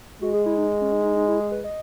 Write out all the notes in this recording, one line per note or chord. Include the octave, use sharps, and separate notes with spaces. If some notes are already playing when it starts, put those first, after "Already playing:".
G#3 F#4
G#4
E4
D#4
C#4
D#4
D#4
D#4
E4
G#4
B4
D#5